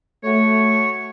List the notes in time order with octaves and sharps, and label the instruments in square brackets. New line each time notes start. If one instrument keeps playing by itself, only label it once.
[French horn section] A3 [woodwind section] F#4 C#5 C#6